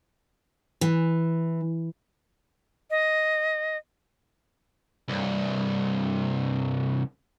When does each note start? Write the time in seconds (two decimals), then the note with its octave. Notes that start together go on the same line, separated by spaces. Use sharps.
0.81 E3
2.90 D#5
5.08 C2 G2